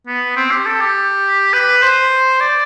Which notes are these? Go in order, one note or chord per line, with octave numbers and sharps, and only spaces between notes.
B3
C4
G4
A4
G4
B4
C5
D5